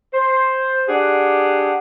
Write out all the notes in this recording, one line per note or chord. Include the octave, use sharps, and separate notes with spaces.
C5
D4 G4 G#4 F#5